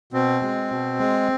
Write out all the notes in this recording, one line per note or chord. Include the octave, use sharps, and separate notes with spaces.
B2 C4
G#3
B2
G#3